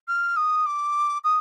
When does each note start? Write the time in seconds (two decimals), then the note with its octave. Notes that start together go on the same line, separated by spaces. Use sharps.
0.08 F6
0.36 D#6
0.66 D6
1.24 D#6